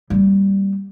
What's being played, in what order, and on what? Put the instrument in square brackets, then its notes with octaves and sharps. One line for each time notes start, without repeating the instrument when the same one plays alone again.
[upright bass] G3 A#3